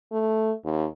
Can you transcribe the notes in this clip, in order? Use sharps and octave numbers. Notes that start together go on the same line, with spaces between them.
A3
D#2